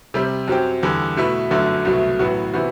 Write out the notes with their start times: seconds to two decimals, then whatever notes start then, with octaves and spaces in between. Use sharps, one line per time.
0.14 C3 G3 C4
0.48 F#2 F#3 C4 G4
0.83 E2 D3 G3
1.17 B2 A3 E4 B4 E5
1.50 G1 F#2 D3 F#3 A3
1.85 C2 B2 F#3 A3
2.19 A1 A2 F#3 B3 F#4
2.54 C3 E3 B3 F#4